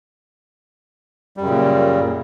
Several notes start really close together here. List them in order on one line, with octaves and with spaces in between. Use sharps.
G3 F#2 C#3 A#2